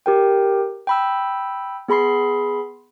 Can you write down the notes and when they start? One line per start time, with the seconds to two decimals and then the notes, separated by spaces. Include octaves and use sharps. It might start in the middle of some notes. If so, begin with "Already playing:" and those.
0.06 G4 A#4 G5
0.87 G5 B5 E6
1.88 B3 G#4 B5 C6 C7